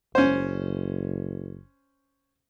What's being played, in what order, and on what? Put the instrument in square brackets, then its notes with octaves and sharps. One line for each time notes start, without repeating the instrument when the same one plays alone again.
[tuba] F#1 [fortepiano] C#4 C5